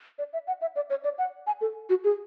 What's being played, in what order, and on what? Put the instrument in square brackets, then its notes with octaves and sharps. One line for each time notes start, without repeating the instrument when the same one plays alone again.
[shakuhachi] D5
E5
F#5
E5
D5
C#5
D5
F#5
G#5
A4
F#4
G#4